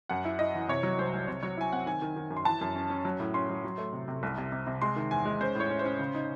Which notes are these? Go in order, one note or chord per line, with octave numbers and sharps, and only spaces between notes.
F#2 F#5
E4
E4 D#5
E3
C3 C#5
F#3
C2 C5
C2
C3 C#5
F#3 C#5
E4 G#5
C4 F#5
D#3 G#5
D#3
D#3
F#2
C6
E3 A5
F#2
C#4
C#4
F#3
A2
C#4 C6
F#3
F#3
A3
C3
C3
C2
C3
C3
C3
G#3 C6
D#3
E2 G#5
G#3
C#4 C5
A2 C#5
C#4
C5
C#4
C#3
D#4